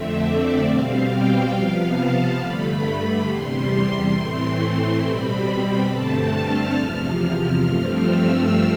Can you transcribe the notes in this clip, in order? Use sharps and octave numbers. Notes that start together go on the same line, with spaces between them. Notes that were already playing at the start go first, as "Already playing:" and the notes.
Already playing: F2 D3 A3 C4 E5
D5
B2 G3 C4 F5
G5
C3 F3 B3 F5
A5
G2 D3 A3 B5
E2 C3 G3 C6
A2 E3 A3 C4
B2 G3 C4 B5
G2 D3 A3 C4 A5
F6
E2 C3 F3
G2 F3 A3 C4 F6
E6